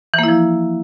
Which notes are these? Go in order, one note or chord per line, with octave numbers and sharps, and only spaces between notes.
E3 F3 A#3 E4